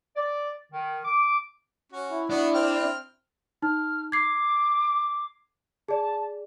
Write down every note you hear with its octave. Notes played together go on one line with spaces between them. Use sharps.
D5
D#3
D6
C#4 F#4
E4
B3 D4 F#4
C4 G5 F6
D#4 F6
D6 G#6 C7
G#4 D5 A5